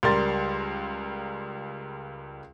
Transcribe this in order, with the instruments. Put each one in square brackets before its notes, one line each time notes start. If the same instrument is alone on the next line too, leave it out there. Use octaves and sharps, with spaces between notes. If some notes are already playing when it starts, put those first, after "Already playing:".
[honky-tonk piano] C#2 G3 A#4 C6 A6